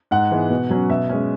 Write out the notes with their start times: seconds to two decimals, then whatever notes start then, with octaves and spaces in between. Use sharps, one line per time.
0.11 G#2 F#5
0.31 E3 G#3 B3
0.50 B2
0.70 F#3 C#4
0.89 B2 E5
1.09 G#3 C#4